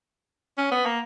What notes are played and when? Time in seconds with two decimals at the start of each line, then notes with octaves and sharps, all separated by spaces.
0.58 C#4
0.72 B3
0.86 A#3